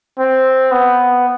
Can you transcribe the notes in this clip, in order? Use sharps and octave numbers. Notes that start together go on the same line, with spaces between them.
C4
B3